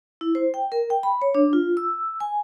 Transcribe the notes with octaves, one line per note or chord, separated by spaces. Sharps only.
E4
C5
G5
A#4
G5
B5
C#5
D4
F4
E6
G#5